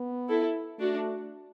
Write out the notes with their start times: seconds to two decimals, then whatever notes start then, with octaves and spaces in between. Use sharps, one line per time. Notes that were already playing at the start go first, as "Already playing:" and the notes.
Already playing: B3
0.28 E4 A4
0.79 A3 D4 F#4